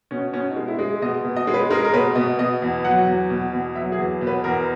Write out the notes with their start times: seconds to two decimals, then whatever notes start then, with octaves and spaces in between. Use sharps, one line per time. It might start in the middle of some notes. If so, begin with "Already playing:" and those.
0.11 B2 C#4
0.33 B2 C#4
0.51 D#4
0.56 G#3
0.68 E4
0.79 G#3
1.02 B2 D#5
1.24 B2
1.36 D#5
1.47 G#3
1.54 B4
1.70 G#3 A#4
1.85 A#4
1.93 B2 B4
2.15 B2 D#5
2.39 B2 D#5
2.62 E2
2.84 F#3 F#5
3.07 E2
3.30 B2
3.53 E2
3.75 F#3 E5
3.92 G#4
3.99 E2
4.21 B2
4.27 B4
4.44 E2 A#4